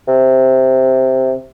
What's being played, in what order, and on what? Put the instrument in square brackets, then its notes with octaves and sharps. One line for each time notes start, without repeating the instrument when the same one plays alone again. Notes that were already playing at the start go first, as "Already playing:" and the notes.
[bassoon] C3